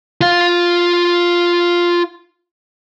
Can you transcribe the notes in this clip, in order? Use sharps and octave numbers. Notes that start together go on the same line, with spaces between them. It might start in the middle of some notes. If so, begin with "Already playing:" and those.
F4 F5